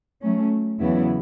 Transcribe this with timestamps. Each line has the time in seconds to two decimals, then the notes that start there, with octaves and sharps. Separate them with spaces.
0.22 F#3 A3 C#4
0.79 E2 C#3 F#3 B3 E4